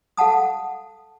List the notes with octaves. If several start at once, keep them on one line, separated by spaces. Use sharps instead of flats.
A4 F5 F#5 A5 D#6